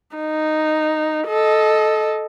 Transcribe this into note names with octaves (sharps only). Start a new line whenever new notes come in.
D#4
A4 D#5